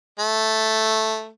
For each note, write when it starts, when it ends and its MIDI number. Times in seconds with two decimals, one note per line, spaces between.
0.19 1.28 57